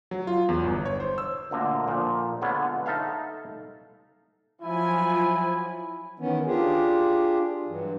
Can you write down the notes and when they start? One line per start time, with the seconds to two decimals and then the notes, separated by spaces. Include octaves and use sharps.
0.11 F#3
0.27 F4
0.49 E2
0.64 G1
0.85 C#5
1.00 C5
1.18 E6
1.51 D2 A#2 D3 D#5
1.88 A#2 F3
2.42 D3 G#3 B3 F4 C#5
2.86 D#4 A4 E5 F5
4.62 F3 F#3 E4 G#5
6.19 D#3 E3 B3 C#4
6.47 D4 F4 G4 G#4
7.67 G2 E3 F#3